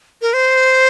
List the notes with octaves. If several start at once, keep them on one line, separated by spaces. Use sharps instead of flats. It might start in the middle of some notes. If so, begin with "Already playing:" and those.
A#4
C5